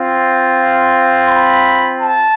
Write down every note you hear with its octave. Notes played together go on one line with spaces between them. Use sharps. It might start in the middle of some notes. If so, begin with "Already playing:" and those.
Already playing: C4 F4
B5
A5